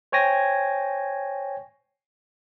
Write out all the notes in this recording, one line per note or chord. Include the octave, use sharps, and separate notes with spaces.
C5 C#5 G5 G#5 A#6